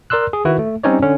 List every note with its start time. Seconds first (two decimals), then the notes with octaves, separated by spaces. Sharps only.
0.10 A#4 D5 C6 E6 F#6
0.33 G#4
0.45 D#3 E4 F#4 B4
0.59 A3
0.83 G3 C4 C#4 D#4 C#5 D5
1.02 D3 C#4